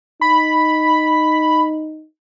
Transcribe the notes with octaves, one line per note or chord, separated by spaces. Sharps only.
D#4 B5